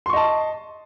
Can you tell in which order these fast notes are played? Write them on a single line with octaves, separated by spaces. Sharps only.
C6 C#6 D#5 A5